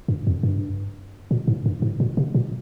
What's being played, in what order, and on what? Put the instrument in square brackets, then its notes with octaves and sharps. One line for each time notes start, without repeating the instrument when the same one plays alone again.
[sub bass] G2
F2
G2
A#2
G#2
G2
G#2
A#2
C3
A#2